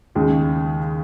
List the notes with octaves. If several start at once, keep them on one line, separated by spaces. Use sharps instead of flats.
D#2 C#3 G#3